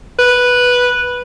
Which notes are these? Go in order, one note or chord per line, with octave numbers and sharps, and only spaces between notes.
B4